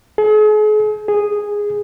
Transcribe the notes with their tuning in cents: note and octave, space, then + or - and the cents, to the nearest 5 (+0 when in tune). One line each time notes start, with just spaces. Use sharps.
G#4 +40
G#4 -10